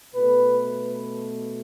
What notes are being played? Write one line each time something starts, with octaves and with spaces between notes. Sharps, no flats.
B2 A3 B4